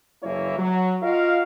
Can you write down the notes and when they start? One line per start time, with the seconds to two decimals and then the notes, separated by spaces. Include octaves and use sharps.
0.23 F#1 E3 A#3 E4 C#5 E5
0.58 F#3
1.02 F4 F#4 A#4 D#5 F5